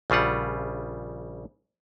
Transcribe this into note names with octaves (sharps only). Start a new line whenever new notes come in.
A#1 C#3 G3 F4 F#5